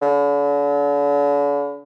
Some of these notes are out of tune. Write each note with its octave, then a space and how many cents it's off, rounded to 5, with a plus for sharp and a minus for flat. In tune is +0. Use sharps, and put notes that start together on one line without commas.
D3 -45